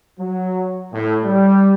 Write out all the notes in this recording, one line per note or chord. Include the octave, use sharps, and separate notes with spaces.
F#3
A2
G3